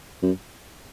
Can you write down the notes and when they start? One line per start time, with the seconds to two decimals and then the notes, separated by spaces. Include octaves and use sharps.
0.22 F#2